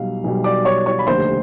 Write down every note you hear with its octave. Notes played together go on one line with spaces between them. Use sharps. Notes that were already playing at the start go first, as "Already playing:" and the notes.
Already playing: B1 B2 G3 F5
B1 B2 G3
D5 D6
C#5 C#6
C#5 C#6
B5
F1 D#2 D3 C5 C6